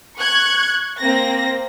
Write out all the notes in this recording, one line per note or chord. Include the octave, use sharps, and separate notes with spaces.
C#6 F#6 G#6
A#3 C4 A#6